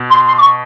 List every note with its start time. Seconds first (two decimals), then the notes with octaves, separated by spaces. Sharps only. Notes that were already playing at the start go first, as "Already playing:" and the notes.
Already playing: B2
0.11 C6
0.26 C6
0.37 D6
0.41 C#6